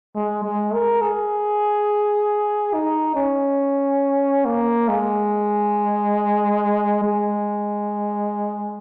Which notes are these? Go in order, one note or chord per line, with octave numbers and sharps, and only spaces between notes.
G#3
G#3
A#4
G#4
D#4
C#4
A#3
G#3
G#3